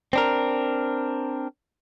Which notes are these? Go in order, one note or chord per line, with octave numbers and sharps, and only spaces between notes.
C4 D4 A#4